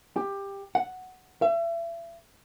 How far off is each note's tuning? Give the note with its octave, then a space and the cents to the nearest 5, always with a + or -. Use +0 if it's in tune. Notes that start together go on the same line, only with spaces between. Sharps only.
G4 +15
F#5 +0
E5 +35